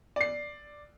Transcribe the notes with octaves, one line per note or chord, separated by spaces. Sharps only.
D5 C7